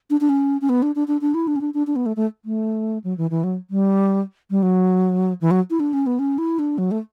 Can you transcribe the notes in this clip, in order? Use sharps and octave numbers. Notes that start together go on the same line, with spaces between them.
D4
D4
C#4
C#4
B3
D4
D4
D4
D4
E4
D4
C#4
D4
D4
D4
B3
A3
A3
A3
F#3
E3
E3
F#3
G3
G3
F#3
E3
F#3
E4
D4
C#4
B3
C#4
E4
D4
F#3
A3